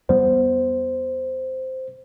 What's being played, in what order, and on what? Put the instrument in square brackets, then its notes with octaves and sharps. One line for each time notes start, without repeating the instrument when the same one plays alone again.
[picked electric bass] E2 G3 B3 [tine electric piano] C5